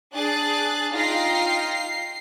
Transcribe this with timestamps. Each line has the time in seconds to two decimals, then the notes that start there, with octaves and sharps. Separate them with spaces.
0.13 D4 G#4 F#6 A6
0.93 D#4 F4 F5 G5 A#6 C7
1.73 C7